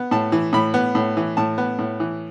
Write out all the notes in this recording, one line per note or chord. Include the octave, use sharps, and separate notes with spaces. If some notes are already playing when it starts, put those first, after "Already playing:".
Already playing: B3
A2 A5
E3
A2 B5
B3
A2
E3
A2 A5
B3
A2
E3